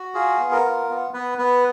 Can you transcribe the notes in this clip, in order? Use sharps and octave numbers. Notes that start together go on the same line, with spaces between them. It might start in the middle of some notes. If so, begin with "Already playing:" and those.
Already playing: F#4
F4 G#4
B3
A#4
F4
B3
B3 B4
B3 B4